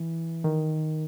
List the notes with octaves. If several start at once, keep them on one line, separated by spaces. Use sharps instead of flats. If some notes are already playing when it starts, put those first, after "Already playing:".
Already playing: E3
D#3